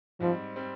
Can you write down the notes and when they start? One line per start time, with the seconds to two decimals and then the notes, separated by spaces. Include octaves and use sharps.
0.20 G#2 F3 G3 C4
0.56 G3 C4